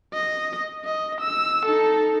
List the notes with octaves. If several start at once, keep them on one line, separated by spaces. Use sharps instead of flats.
D#5
D#5
E6
D#4 A4